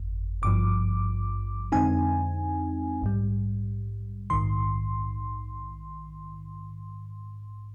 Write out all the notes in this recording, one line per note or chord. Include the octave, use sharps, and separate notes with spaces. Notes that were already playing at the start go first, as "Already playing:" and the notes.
Already playing: G1 F2
G#1 G2 F3 D6
F2 D3 G#3 C4 D#4 G#5
A#1 G#2 G3
A#1 G#2 D#3 C6